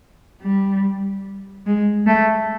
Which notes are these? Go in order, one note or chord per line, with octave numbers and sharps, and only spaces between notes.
G3
G#3
A3